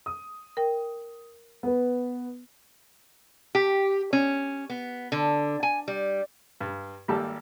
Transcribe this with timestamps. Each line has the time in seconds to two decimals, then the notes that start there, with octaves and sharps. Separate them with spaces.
0.06 D#6
0.57 A#4 G5
1.63 B3 B4
3.55 G4
4.13 C#4
4.70 B3
5.12 D3
5.63 G#5
5.88 G3
6.61 G2
7.08 G#1 G3 A#3 G4 A4 A5